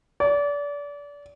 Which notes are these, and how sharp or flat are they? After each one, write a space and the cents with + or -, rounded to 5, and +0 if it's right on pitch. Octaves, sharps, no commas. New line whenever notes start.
D5 -30